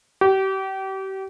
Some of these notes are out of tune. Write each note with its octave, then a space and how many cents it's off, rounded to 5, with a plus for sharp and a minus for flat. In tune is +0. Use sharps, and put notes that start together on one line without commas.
G4 -35